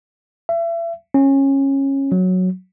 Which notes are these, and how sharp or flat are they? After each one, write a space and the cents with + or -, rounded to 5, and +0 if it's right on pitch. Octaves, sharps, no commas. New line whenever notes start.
E5 +35
C#4 -20
F#3 -5